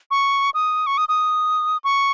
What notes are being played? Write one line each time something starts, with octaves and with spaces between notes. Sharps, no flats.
C#6
D#6
C#6
D#6
D#6
C#6